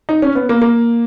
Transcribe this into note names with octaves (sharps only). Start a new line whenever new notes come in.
D#4
C#4
B3
A#3
A#3